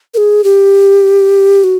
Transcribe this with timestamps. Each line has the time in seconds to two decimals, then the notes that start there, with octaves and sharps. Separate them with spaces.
0.14 A#4
0.17 G#4
0.44 G4
1.64 F#4